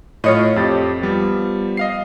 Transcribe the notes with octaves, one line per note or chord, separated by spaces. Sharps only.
A2 F4 C#5 D#5
F2 G4 A6
F3 G3 B3
D#5 F5 C7